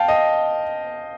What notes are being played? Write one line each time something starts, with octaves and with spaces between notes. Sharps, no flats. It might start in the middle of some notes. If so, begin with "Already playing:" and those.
Already playing: F5 G5 A5
D#5